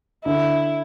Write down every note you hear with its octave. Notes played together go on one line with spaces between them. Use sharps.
D3 E4